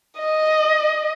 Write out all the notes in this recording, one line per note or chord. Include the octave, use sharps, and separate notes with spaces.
D#5